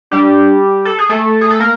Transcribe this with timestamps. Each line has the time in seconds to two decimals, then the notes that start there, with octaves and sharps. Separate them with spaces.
0.12 G3 D4 G4
0.85 A4
0.99 G#4
1.09 A3 A4
1.41 G#4
1.51 A4
1.59 A#3 A#4